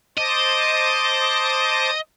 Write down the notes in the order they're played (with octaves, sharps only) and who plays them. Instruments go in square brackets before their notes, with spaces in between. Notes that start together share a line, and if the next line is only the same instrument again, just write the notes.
[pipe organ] C5 A5 D6 [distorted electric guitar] D#5